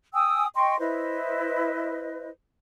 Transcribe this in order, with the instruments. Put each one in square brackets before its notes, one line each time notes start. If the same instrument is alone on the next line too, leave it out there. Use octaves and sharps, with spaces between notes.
[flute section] G5 G#5 D#6 E6
D#5 G5 C6 C#6
E4 B4 C5 D#5